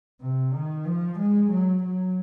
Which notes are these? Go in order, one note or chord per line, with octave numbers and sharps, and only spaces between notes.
C3
D#3
F3
G#3
F#3
F#3